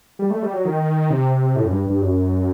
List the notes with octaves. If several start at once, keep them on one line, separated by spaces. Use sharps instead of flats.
G3
A3
G3
F#3
D#3
C3
A2
F#2
G2
G2
F#2